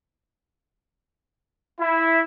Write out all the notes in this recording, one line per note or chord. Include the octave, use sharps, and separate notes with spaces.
E4